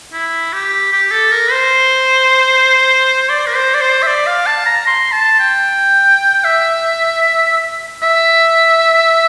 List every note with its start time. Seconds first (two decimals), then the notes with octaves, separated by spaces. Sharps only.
0.13 E4
0.53 G4
0.92 G4
1.11 A4
1.31 A#4
1.52 C5
3.29 D5
3.47 A#4
3.55 C5
3.75 D5
3.81 C5
4.03 E5
4.07 D5
4.27 F5
4.47 A5
4.66 A#5
4.87 C6
5.12 A5
5.39 G5
6.44 E5
8.02 E5